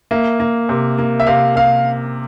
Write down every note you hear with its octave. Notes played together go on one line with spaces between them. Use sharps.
A#3 E5
A#3
C3
A#3
E5
C3 F5
C3 F5